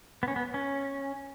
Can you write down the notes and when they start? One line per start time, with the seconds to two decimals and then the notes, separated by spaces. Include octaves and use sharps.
0.23 B3
0.28 C#4
0.36 B3
0.54 C#4